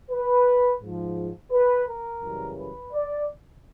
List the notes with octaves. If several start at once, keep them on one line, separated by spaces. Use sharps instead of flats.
B4
G#2 F3
B4
A#4
F#2 C#3 E3 G3
B4
D5